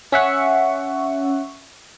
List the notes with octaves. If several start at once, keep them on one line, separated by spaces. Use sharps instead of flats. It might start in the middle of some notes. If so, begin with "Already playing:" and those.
C#4 E5 F#5 C#6